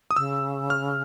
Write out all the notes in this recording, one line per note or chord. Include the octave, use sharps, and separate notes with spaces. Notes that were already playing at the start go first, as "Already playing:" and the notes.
D#6
C#3 E6
F6